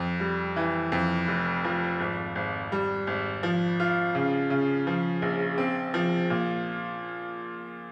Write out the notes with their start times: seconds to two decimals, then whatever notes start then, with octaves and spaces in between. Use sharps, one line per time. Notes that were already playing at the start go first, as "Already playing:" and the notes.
Already playing: F2
0.20 G3
0.56 E3
0.92 F2
1.27 F1
1.64 F3
2.00 G#1
2.35 G#1
2.72 G3
3.07 G#1
3.43 F3
3.80 F4
4.15 C#3
4.50 C#3
4.87 F3
5.22 A#1
5.58 C4
5.94 F3
6.30 A#2